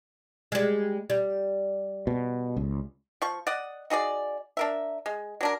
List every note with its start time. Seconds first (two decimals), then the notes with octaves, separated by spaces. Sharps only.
0.52 G3 G#3
1.10 G3
2.07 B2
2.57 C#2
3.22 F3 C#6
3.47 D5 D#5 F#5
3.90 D#4 F#4 G#4 D5
4.57 D4 A#4 E5
5.06 G#3
5.41 F#3 D4 A#4